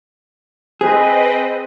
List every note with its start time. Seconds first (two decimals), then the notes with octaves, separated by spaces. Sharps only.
0.81 C4 G#4 B4 D#5